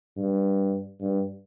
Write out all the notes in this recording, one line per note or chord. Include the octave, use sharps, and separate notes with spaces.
G2
G2